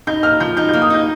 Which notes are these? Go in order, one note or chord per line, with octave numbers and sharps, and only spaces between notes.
D#4 G6
A#3 F6
F3 G6
D#4 G6
A#3 G6
D#6
D#4 G6